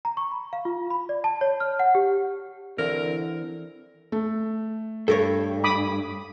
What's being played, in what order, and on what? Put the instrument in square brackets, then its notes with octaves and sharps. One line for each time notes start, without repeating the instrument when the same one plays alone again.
[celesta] A#5
C#6
B5
F5
F4
B5
D5
A5
C#5
F6
F#5
G4
[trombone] D3 [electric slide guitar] E3 C4 [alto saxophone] A#4
[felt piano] A3
[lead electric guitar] G2 [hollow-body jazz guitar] A4 A#4 C#5
[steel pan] B5 D6 D#6